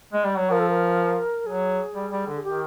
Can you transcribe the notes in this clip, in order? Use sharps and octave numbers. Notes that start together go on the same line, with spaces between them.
G#3
G3
F#3
F3 A#4
A4
A#4
F#3 G#4
G3
G3
D3
G#4
D#3 G4